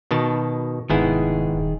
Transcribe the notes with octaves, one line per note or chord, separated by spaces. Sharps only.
B2 D#3 A5
F1 G#2 D#3 B3 E4 G#4
D#1